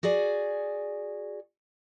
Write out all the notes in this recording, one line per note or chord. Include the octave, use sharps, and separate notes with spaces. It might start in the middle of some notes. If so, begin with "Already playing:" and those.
F#4 G#4 D5 G#5